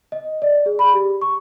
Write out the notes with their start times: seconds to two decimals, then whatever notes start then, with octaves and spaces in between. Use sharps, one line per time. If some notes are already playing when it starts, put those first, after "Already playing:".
0.12 D#5
0.42 D5
0.66 G#4
0.79 B5
0.94 G4
1.22 C#6